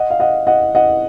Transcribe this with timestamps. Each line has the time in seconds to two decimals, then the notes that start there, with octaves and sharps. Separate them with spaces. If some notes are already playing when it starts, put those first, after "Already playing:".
Already playing: D#5 F#5
0.10 F5
0.20 D#5 F#5
0.47 D#5 F#5
0.75 D#5 F#5